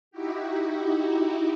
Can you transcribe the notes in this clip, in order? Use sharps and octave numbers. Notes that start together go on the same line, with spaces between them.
D#4 E4 F#4 G4